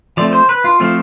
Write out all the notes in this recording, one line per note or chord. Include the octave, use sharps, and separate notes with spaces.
F3 A3 C4 D5
C5
B4
F4
F3 A3 C4 F4